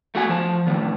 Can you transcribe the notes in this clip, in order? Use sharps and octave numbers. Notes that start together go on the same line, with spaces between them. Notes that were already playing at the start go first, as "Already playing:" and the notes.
A3 F#4 G#5
F3 C5
A2 D#3